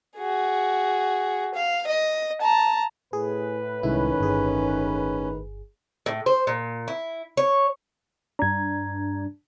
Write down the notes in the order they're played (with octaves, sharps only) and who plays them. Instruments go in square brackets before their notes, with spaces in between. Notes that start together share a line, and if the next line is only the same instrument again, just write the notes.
[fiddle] F#4 G#4
F5
D#5
A5 A#5
[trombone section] A2 B4 [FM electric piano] G#4
[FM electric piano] C2 G#3 E4 [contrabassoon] D#3 [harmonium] C#4
[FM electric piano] G1 G#4
[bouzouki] A2
C5
A#2
E4
C#5
[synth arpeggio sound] G2 D4 [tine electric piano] A#5 G#6